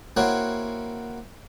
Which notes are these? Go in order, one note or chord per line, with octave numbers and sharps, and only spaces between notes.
A#3 C4 E4 F#4 C#5 F#5